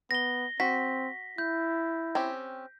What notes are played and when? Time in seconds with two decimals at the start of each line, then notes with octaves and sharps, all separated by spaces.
0.11 B3 A#6 G7
0.60 C4 F#4 B6
1.38 E4 G6
2.15 C4 C#4 G4